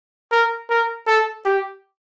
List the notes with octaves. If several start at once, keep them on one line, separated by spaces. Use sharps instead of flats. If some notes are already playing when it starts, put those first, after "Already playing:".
A#4
A#4
A4
G4